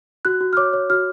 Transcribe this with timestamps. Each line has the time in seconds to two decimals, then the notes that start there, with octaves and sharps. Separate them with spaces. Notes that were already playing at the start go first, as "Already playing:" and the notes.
0.25 F#4 F#6
0.41 F#4
0.53 F6
0.57 C#5 D6
0.73 C#5
0.90 F#4 F6